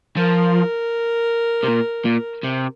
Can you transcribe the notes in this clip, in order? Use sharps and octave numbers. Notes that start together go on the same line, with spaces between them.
F3 A#4
C3
A#2
A#2
C3